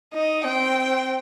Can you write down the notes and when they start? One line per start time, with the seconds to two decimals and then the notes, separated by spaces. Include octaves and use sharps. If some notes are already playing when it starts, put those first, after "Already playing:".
0.13 D#4 D#5
0.44 C4 G5